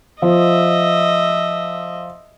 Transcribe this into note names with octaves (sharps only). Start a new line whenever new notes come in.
F3 D#5 E5